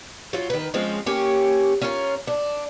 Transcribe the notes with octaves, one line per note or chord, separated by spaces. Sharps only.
F#3 F4
D#3 B4
F3 G#3 C4 C#4
A#3 C#4 G4
C#4 F4 A#4
D4